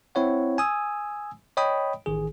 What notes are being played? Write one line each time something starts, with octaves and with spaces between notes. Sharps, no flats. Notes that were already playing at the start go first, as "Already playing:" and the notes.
C4 E4 C#5 F#5
G#5 D#6 E6
C#5 D#5 G5 B5 D#6
A1 D#3 G#4